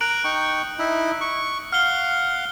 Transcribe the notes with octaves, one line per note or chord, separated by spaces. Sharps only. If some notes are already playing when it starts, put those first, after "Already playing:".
A#4 A#5 F#6 D7 F#7
D#4 G5 C#6
D#4 E4
C#6
F5 F#5 F6 G7